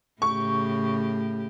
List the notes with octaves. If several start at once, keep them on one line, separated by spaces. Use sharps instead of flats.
A2 C#3 G4 C#6